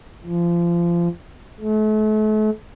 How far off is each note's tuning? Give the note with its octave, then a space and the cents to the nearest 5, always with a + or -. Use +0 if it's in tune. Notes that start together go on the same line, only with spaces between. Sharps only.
F3 -25
A3 -40